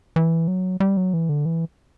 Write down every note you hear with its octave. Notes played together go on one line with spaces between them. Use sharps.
E3
F#3
G3
F#3
E3
D3
E3